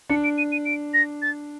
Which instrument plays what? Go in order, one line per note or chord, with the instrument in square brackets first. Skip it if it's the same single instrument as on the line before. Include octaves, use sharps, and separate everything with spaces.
[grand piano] D4 [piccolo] C#7
[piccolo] D7
D#7
D#7
D7
A#6
A6